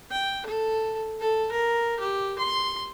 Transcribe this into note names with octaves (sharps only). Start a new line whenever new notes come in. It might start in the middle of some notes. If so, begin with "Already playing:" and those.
G5
A4
A4
A#4
G4
C6